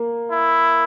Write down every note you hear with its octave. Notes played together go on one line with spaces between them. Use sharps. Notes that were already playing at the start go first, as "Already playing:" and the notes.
Already playing: A#3
E4